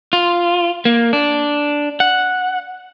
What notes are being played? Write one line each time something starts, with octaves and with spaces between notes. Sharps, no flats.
F4
A#3
D4
F#5